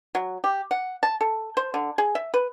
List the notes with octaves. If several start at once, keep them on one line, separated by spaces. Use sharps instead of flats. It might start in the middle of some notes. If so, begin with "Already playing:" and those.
F#3
G4
F#5
A5
A4
C5
D3
G#4
E5
B4